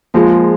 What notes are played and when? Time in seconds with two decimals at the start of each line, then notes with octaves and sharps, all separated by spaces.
0.14 F3 G#3 A#3 F4 G#4